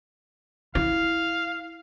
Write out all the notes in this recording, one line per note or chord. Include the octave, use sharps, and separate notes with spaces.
E4 F5